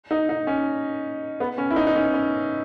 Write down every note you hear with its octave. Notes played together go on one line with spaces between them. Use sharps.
D#4
D#4
C#4
B3
C#4
E4
D#4
D#4
C#4
C#4